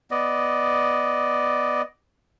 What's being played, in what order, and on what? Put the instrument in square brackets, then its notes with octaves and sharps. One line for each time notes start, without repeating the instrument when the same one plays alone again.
[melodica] B3 D5 D#5